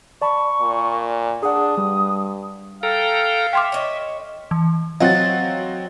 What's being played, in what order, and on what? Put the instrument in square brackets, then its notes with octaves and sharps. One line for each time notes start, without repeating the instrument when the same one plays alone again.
[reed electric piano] D5 A5 B5 [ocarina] C#6
[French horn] A#2
[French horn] D4 [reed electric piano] G#4 F#5 [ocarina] D#6
[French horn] G2 [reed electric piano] G3
[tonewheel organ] A4 G5 A#5 [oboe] F5
[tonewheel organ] E5 [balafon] G5 C6 D6
[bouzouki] C#5 D#5
[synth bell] E3
[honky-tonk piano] F#3 C4 F#4 [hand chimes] D#5 A6 [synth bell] F5